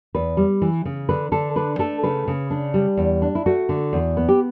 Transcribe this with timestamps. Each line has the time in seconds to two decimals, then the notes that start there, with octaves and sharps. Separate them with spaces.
0.15 E2 B4
0.37 G3
0.62 E3
0.85 C#3
1.09 D3 B4
1.32 D3 A4
1.56 D4 B4
1.79 A3 A4
2.03 C#3 B4
2.28 C#3
2.50 D4
2.74 G3
2.97 E2
3.22 D4
3.35 E4
3.46 A3 F#4
3.69 D3
3.93 E2
4.17 B3
4.29 G4